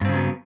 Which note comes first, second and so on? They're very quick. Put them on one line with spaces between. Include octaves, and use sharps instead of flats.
G2 C4 C#3 F#3 B3